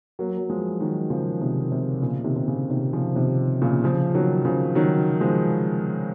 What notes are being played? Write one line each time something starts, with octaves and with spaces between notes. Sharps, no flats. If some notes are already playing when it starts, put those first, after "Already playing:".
F#3 A#3
F#3
F3 G#3
D#3 F#3
C#3 F3
C3 D#3
C3
A#2 C#3
C3 D#3
C3
A#2 C#3
C3 D#3
C#3 F3
C3 D#3
A#2 C#3
C#3 F3
D#3 F#3
C#3 F3
D#3 F#3
F3 G#3